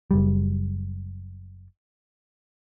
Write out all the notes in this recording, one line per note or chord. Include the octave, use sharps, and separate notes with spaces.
F#1 G3